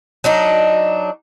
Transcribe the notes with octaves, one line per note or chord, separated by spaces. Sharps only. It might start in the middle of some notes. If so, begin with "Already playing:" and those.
F#3 D4 D#4